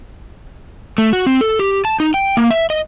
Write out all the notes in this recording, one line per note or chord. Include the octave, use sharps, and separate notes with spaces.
A3
F#4
C4
A4
G4
A5
D#4
G5
A#3
E5
D#5